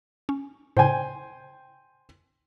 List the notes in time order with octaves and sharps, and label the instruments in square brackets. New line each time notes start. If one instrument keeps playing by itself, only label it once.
[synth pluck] C#4
[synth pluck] A2 C#3 [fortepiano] C5 G5 G#5